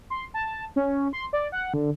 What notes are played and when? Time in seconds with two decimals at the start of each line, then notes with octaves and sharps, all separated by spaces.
0.10 C6
0.34 A5
0.76 C#4
1.13 C6
1.33 D5
1.52 F#5
1.74 D3